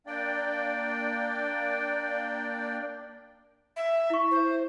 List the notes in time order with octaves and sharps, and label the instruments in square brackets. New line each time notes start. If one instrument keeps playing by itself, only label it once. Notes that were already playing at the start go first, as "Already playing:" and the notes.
[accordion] A#3 D4 D5 G5
[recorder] E5
[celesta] E4 C#6
[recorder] C5